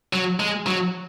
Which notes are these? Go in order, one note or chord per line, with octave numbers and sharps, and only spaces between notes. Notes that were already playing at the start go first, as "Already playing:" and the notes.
F#3
G#3
F#3